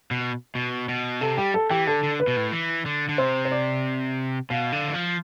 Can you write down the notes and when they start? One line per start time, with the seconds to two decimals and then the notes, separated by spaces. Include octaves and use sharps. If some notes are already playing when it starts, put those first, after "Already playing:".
0.11 B2
0.55 B2
0.89 B2
1.21 C3 A4
1.37 G3 G4
1.54 A4
1.70 E3 G4
1.87 D3 A4
2.03 D3
2.20 B4
2.27 B2
2.37 A2
2.52 E3
2.86 D3
3.09 D3
3.18 C3 C5
3.45 C5
3.52 D5
4.50 B2 F5
4.72 D3
4.88 E3
4.94 F3